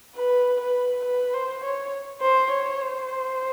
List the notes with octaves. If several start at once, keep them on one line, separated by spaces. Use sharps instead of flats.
B4
B4
B4
C5
C#5
C5
C#5
C5